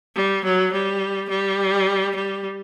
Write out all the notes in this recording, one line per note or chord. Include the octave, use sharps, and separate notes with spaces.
G3
F#3
G3
G3
G3